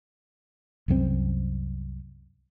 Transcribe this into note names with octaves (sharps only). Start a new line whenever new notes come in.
C2 F#2 G#3 C4